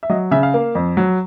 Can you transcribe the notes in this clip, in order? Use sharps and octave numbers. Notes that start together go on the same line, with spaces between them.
E5
F#3 D#5
C#3 E5
F5
A#3
F2
F#3